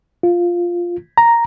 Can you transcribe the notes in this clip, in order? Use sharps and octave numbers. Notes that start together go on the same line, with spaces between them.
F4
A#5